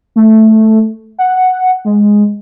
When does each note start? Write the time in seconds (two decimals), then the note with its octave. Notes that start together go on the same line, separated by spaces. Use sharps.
0.16 A3
1.19 F#5
1.85 G#3